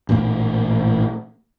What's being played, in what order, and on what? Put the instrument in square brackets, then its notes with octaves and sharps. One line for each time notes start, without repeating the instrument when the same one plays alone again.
[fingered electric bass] A1 A#2 C#3 A#3